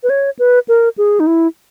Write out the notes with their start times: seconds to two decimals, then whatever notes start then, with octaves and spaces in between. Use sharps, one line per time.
0.03 B4
0.10 C#5
0.39 B4
0.68 A#4
0.98 G#4
1.20 D#4
1.27 E4